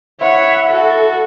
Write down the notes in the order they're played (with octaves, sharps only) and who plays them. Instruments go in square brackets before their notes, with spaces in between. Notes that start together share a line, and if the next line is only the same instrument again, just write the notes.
[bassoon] E4 [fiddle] C#5 [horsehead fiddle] E5 F#5
[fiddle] F#4 [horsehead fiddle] A4